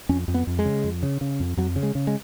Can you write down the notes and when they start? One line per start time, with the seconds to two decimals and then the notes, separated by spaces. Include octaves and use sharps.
0.09 F2 C#4
0.28 F2
0.34 B3
0.47 F2
0.59 G#3
0.65 C#3
0.84 F2
1.03 C#3
1.21 C#3
1.40 F2
1.57 F2 F#3
1.76 C#3
1.83 G#3
1.95 C#3
2.07 G#3